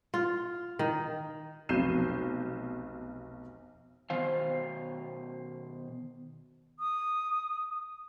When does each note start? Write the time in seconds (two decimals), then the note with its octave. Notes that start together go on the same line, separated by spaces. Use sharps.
0.14 F4
0.79 D#3
1.69 F1 B1 G6 C7 D#7 E7
4.10 B2 D#3 C5 F5
6.79 D#6